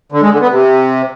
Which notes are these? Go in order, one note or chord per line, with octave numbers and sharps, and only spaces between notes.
D3
G#3
D3
B3
C3